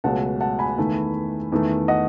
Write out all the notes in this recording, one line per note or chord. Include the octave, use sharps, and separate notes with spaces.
C#2 B2 F#3 A3 F#5 A5
F#5 A5
G#5 B5
E2 D#3 A3
E2 D#3 A3
D#5 F#5